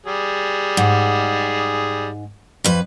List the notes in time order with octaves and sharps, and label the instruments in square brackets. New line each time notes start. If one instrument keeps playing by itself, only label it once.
[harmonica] G3 G#4
[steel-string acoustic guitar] G#2
F2 B4